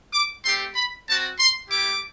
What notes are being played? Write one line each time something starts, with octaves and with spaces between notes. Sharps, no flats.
D6
A3 C4 G4 C6
B5
C4 F#4 A5
C6
A3 E4 G4 D6